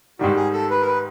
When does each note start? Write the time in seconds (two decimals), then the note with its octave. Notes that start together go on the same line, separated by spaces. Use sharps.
0.19 G#2 D#3 G3 F#4
0.36 G#4
0.53 A4
0.70 B4
0.82 A#4
0.86 B4